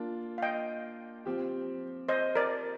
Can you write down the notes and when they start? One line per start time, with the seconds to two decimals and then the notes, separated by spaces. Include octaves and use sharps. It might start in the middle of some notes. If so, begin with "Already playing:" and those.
Already playing: A#3 D4 F4
0.38 F5
0.42 D#5 G5
1.25 F3 C4 G4
2.09 C5 D#5
2.36 A#4 D5